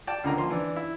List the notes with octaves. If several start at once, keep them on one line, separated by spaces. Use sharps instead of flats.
D5 G5 A5 D6
C#2 D3 A#4 A#5
F3 A#3 C6
E3 D4
E4